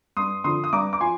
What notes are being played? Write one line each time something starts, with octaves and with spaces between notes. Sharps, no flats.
G2 C6 D#6
D3 F3 C6 D#6
D#6
G2 A#5 D6
D6
F3 G#5 C6